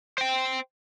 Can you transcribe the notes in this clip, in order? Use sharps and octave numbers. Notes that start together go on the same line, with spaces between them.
C5 G5